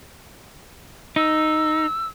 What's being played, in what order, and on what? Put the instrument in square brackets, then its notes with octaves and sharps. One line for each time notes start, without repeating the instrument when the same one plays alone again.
[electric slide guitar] D#4 [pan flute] E6